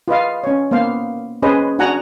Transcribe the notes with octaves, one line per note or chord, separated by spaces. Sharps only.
F4 B4 D#5 F5
C#4 C#5
A#3 B3 C5 F5
C#4 G#4 B4 C5 D#5
D4 F#4 F#5 G#5 A#5